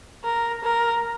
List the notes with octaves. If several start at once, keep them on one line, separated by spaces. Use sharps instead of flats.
A#4
A#4